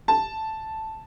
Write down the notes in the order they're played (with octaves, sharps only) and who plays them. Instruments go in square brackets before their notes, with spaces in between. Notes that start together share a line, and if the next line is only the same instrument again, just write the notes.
[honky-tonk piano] A5